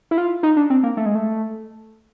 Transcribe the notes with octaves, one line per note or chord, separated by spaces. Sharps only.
E4
F4
D#4
D4
C4
A#3
A3
G#3
A3